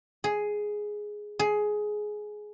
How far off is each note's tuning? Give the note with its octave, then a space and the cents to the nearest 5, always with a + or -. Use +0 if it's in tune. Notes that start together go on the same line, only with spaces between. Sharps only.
G#4 +5
G#4 +15